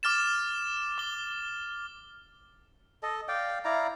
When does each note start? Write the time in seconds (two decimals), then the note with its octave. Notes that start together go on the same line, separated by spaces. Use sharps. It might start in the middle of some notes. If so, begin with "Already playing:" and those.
0.03 D6 F6 A6 E7
0.98 D6 G7
3.03 A4 D#5
3.28 D5 F5 G5
3.65 E4 D5 F5 A#5